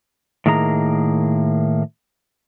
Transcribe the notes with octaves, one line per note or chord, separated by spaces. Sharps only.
A2 D#3 A#3 G#4 A5 A#5